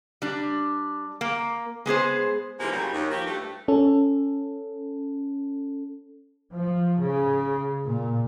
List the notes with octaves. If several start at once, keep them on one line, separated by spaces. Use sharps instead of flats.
G3 D4
A#3
G#3 B3 G#4 C5
G#2 C3 E3 F3 G#3 A#3
A#2 C#3 F#3 G3
D#2
D#2 F3 F#4 G4
G2 A3
C#4 A4
F3
C#3
A#2